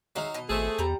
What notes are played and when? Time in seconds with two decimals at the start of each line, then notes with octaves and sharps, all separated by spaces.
0.16 F#3 G#3 D#4 E5 F5
0.34 B2 D#5
0.49 G#1 A3 G#4 A4 C5 E5
0.79 E2 G3 A#5